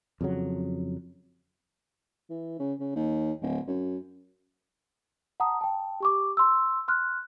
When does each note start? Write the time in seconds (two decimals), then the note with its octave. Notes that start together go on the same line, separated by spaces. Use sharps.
0.21 F2 C#3 F#3
2.30 E3
2.59 C#3
2.79 C#3
2.96 D#2
3.41 D1
3.67 F#2
5.40 F#5 A5 A#5 D#6
5.61 G5 A5
6.00 G4 C#6 D6
6.37 C6 E6
6.88 C6 F6 F#6